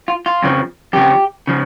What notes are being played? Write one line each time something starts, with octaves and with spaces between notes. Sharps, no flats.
F4
F4
F2 C#3 F3
F2 C#3 F3 G4
C#3 F3